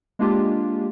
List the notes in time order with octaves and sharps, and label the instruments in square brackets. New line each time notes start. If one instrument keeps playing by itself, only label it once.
[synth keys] G#3 A#3 D4 F4 G4